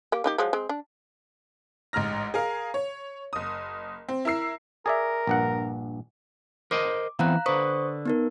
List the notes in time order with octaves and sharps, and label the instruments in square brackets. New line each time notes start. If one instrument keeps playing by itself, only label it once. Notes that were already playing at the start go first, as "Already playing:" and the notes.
[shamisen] A#3 G4
A#3 D#4 G4
F3 F#3 G#3
G#3 C4
D4
[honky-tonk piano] A1 G#2 A#5 F6 A#6
G#4 A#4 F5
C#5
F#1 D#6
C4
E4 A#4 E6 C7
[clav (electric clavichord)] G#4 D5 E5 [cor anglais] A#4
[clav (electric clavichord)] A#1 G2 F#5
[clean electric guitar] A#4 C5 D#5 [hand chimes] D6
[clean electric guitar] E3 B3 C4 [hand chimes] F5 A#5 F#6
[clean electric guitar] D3 B4 [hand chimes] C5 C#6 D#6
[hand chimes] B3 D#4 A#4